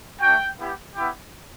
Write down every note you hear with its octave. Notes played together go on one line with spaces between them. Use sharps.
A3 D4 F#4 G5
B3 E4 G4
B3 E4 G4